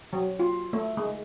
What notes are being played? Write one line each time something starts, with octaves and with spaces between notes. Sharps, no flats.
F#3
F4
A3
G#3